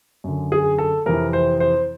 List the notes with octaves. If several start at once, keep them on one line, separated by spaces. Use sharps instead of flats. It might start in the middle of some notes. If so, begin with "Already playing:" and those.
F#2 D3
G#4
A4
F2 C3 E3 A#4
C5
C5